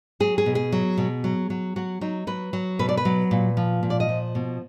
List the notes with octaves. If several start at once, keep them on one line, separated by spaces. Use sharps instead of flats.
F#3 G#4
G#4
B2
G#4
F#3
B2
F#3
F#3
F#3 F#4
F#3 D#4
F#3 B4
F#3
B2 B4
D5
B4
F#3
A#2
F3
A#2
D5
D#5
F3
B2